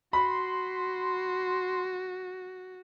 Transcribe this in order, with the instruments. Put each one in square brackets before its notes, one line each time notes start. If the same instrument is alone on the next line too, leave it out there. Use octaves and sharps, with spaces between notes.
[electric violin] F#4 [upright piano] B5 [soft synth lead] C6